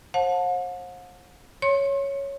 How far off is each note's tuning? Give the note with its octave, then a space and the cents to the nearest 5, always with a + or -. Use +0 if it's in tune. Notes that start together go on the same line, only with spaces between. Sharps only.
C5 +40 F#5 -45 A5 +0
C#5 +0 C6 +45